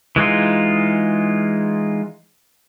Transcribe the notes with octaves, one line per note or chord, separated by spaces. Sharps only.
E3 G#3 D#4 F4